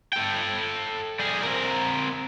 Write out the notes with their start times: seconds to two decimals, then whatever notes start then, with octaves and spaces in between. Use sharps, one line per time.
0.13 A4 G5
1.19 G3 G#4
1.43 C4 A#4